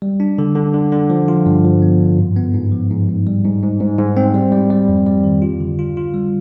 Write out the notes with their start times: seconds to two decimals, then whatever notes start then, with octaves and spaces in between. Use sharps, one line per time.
0.02 G3
0.20 D4
0.38 D3
0.56 D3
0.74 D3
0.92 D3
1.10 F3
1.28 F4
1.46 G2
1.64 F3
1.82 B3
2.00 G2
2.19 G#2
2.36 B3
2.54 G#2
2.72 F3
2.90 G#2
3.09 G#2
3.27 G3
3.44 G#2
3.63 G#2
3.80 G#2
3.99 G#2
4.17 C4
4.34 G3
4.52 G3
4.71 G3
4.88 F2
5.06 G3
5.24 D#3
5.42 F4
5.60 D3
5.79 F4
5.97 F4
6.14 G3